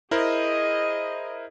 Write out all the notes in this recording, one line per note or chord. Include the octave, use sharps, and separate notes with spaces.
E4 G#4 A#4 C5 D#5